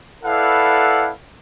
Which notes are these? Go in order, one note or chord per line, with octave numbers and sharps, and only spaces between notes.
E4 A4 B4 D5 F5 F#5